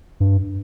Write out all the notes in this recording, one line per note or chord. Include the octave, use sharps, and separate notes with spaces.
G2